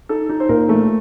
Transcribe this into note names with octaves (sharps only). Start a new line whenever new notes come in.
D#4 A4
D#4
C5
A#2 A#4
A3